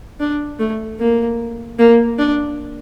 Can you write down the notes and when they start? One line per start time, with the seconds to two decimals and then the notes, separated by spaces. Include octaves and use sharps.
0.20 D4
0.59 A3
1.00 A#3
1.79 A#3
2.19 D4